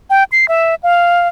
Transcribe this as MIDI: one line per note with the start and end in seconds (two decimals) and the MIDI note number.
0.10 0.24 79
0.32 0.48 96
0.48 0.75 76
0.83 1.28 77